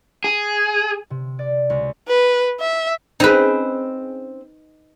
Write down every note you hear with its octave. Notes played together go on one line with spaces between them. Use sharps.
G#4
C3
D5
C#2
B4
E5
C4 C#4 D#4 G#4 B4